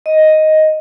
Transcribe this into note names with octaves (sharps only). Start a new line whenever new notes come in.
D#5